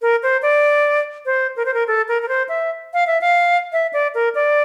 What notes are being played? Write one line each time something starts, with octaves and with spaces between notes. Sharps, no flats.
A#4
C5
D5
C5
A#4
C5
A#4
A4
A#4
A#4
C5
E5
F5
E5
F5
E5
D5
A#4
D5